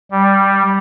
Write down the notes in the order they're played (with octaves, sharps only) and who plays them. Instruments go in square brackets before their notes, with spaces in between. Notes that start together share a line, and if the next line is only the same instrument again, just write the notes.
[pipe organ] G3